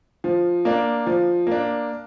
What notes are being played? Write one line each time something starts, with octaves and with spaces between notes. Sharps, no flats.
F3
A#3 D4
F3
A#3 D4